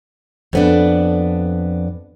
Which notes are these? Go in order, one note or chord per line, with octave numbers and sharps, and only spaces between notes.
F2 B3 D4